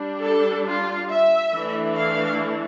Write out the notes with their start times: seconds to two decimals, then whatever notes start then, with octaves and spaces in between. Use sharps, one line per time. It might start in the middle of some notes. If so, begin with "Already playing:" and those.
Already playing: G3 D4
0.23 A4
0.66 F4
1.10 E5
1.53 E3 A3 D4
1.96 F5